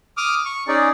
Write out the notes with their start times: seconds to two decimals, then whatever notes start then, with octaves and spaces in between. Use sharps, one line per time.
0.17 D6 D#6 F6
0.45 C#6
0.68 C#4 D#4 G#4 D5